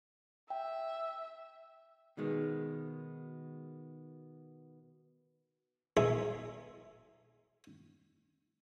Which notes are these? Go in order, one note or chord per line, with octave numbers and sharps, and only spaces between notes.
E5 G5
B2 D#3 G#3 B3
B1 G#3 G#4 E5 D#6